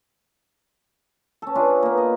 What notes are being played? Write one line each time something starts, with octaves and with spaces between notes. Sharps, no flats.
C#4 A4
D4 F4 G#4 B4
C#5
A#3 B3
D#5